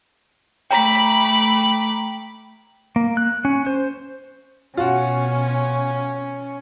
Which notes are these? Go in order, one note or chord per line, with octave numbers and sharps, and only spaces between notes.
A3 G5 A#5 B5 D6 B6
A#3
F#6
C#4
C5
B2 C#4 F4 F#4